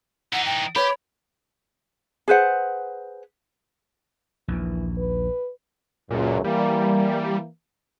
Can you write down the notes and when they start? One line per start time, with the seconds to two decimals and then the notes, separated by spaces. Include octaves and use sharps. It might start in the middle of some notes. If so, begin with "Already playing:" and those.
0.33 E3 D#4 F#5
0.45 G5
0.76 G4 B4 C#5
2.28 G#4 B4 C5 F#5
4.48 A#1 D#2 E3
4.97 B4
6.11 C#2 F#2 A#2
6.44 E3 G3 A#3